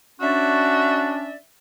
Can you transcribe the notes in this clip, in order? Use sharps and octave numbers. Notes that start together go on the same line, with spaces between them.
C#4 D4 F#4 D5 E5